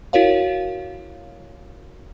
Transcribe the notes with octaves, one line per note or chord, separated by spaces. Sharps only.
E4 F#4 A#4 C#5 F5